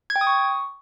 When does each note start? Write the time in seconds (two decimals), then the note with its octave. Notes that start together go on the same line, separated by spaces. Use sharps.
0.10 G#6
0.16 G5
0.21 D#6
0.27 C#6